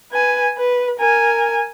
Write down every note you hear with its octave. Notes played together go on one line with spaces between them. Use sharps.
B4 G#5
B4
A#4 G#5